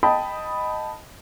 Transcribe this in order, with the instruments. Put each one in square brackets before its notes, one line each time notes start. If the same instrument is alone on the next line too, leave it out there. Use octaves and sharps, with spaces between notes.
[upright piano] D#5 G5 A5 B5 D#6